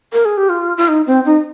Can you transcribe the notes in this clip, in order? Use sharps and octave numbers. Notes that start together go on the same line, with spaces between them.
A#4
G#4
G4
F4
F4
D#4
C4
D#4